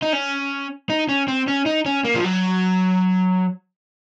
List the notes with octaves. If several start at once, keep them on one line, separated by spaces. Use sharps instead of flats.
D#4
C#4
D#4
C#4
C4
C#4
D#4
C#4
A#3
F3
F#3